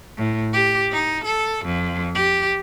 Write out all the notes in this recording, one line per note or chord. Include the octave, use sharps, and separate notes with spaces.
A2
G4
D#4
A4
F2
G4